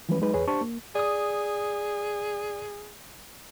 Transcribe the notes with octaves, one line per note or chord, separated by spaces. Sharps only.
E3 F3 G3 G#3 C#4 B4
F#3 G#3 D#4 B4
E2 G#4 B4 C#5
D4 G4 C5 A5 C#6
A#3
G#4 D5 D#6